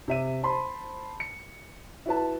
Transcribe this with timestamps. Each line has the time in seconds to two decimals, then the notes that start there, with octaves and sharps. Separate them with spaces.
0.08 C3 E5 D#7
0.43 C5 A5 B5 C6
1.20 C#7
2.06 E4 F#4 B4 A5